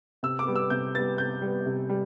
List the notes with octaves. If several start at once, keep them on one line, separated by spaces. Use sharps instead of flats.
C3 E6
D6
G3 B3
E6
C3 G6
G3 B3 A6
C3 G6
G3
B3
C3
G3